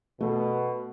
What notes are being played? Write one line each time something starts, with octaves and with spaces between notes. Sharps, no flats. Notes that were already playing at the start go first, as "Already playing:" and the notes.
B2 A3